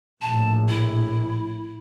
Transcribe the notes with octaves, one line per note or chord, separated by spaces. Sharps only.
A#1 A2 A5
E4